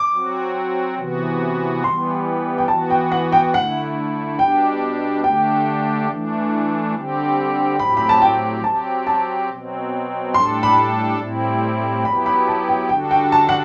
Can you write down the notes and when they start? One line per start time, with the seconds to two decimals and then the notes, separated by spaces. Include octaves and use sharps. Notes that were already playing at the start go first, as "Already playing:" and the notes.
Already playing: D6
0.13 F#3 C4 F#4
0.98 C3 E3 B3 F#4
1.84 E3 G3 B3 C6
2.58 G5
2.68 E3 B3 F#4 A5
2.90 G5
3.12 F#5
3.32 G5
3.54 D3 A3 E4 F#5
4.39 B2 G3 D4 G4 G5
5.24 D3 A3 D4 G4 G5
6.09 E3 A3 D4
6.95 D3 G3 C4 G4
7.79 A2 F#3 C4 G4 B5
7.97 B5
8.09 A5
8.22 G5
8.64 F#3 C4 G4 A5
9.07 A5
9.49 B2 F#3 C4
10.34 A2 G3 D4 A4 C6
10.63 B5
11.19 A2 G3 C4 E4
12.04 F#3 B3 E4 G4 B5
12.26 B5
12.47 A5
12.69 G5
12.89 D3 G3 D4 F#4 A4 G5
13.11 G5
13.32 A5
13.49 F#5